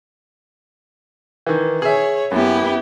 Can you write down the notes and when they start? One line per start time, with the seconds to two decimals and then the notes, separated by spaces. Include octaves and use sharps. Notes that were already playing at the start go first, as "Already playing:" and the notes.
1.47 D#3 E3
1.82 G#4 C#5 E5
2.31 F#2 B3 E4 G4